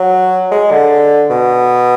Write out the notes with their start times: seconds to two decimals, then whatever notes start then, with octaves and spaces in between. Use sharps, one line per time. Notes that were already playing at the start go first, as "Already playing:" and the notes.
Already playing: F#3
0.51 G#3
0.71 D3
1.30 B2